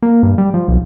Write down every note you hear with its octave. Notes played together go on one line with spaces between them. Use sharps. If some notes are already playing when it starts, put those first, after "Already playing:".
A#3
G2
G3
F3
B1